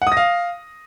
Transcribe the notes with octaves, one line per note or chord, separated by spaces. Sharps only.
F#5
D#6
A#6
F5